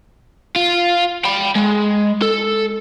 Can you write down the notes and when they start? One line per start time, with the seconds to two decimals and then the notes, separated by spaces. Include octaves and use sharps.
0.56 F4
1.25 G5 B5
1.56 G#3
2.22 A4